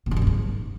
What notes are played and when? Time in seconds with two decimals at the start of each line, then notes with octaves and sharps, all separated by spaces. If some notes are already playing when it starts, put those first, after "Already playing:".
0.06 B2
0.11 G2
0.17 F#2
0.22 B2
0.27 G#2